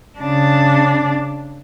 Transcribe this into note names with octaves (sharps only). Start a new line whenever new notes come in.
C#3 D4